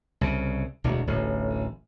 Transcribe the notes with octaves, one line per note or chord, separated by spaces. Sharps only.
C2 C#3
E1 D2
D1 A1